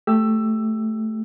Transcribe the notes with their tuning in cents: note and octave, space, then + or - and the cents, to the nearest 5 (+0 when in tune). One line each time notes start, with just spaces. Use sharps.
A3 +0 G4 +0 E6 +10